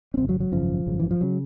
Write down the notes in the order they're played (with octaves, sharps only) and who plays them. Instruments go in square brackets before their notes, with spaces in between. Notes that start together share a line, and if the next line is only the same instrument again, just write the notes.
[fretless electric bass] C#4
G#1 F#2 C#3 C4
F#3
F#3
G#1 F#2 C#3 F3
G#1 F#2 C#3
E3
F3
C#3 F#3